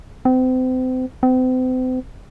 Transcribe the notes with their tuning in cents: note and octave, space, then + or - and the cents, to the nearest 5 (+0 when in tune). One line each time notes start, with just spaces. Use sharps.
C4 -35
C4 -40